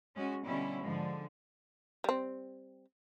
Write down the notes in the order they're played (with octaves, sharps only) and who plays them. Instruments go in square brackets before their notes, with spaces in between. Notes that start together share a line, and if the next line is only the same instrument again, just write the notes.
[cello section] G#3 C#4 F#4
B2 D3 G3 C#4 E4
G#2 D3 F3 G#3
[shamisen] G3 C4